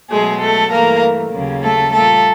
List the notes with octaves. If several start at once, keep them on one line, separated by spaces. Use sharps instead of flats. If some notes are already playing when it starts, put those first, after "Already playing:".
B2 F#3 G#3 A3 G#4
A3 A4
G2 E3 A3 A#3 A#4
D#2 C#3 F#3 A#3
A3 A4
A#2 G3 A3 A#3 A4